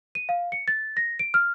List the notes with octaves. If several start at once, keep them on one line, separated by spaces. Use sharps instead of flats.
D#7
F5
C#7
A6
A#6
D7
F6